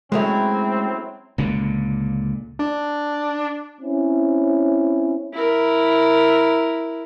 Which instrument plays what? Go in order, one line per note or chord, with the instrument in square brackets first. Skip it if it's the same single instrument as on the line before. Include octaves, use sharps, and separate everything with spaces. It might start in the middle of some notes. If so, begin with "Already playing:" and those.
[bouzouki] F#3 C#4 E4 [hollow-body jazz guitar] G#3 A3 [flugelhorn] C4
[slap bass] C#2 A#2 D3
[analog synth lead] D4
[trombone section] C4 C#4 E4
[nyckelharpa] E4 A#4